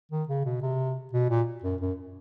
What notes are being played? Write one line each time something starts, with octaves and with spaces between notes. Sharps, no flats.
D#3
C#3
B2
C3
B2
A#2
F#2
F#2